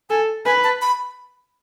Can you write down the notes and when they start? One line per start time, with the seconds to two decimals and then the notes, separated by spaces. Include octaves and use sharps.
0.10 A4 G#5
0.46 B4 G#5
0.64 A5
0.81 B5